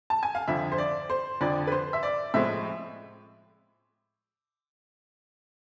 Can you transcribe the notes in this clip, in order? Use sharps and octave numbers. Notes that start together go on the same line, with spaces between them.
A5
G#5
F5
F2 D3 F3 E5
C5
D5
C5
F2 D3 F3 D5
B4
C5
E5
D5
A2 F3 G#3 C4 E5